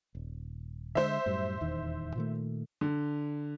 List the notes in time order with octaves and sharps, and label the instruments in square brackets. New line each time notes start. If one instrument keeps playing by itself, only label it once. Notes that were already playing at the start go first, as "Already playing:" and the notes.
[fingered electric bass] D#1
[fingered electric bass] D3 D#3 G#3 [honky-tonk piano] C5 E5
[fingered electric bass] F#2 A2 G3
D#1 E2 D#3
A#2 D#3 A3
[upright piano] D3